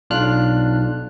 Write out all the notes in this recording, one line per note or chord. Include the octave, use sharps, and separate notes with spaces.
B1 D4 F4 F6 F#6